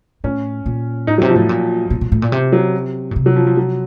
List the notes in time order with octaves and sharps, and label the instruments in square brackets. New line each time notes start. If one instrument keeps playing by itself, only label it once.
[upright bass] A2 [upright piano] C#4
[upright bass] A#2
[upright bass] A2 [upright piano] D#4
[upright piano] F#3
[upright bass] C3
[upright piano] F3
[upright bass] A2
A#2
A#2
A#2
A2
A#2
C3
[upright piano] F#3
[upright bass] A#2
C3
[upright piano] F#3
F3
F3
F#3